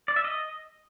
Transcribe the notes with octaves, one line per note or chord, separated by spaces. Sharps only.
D5
E5
D#5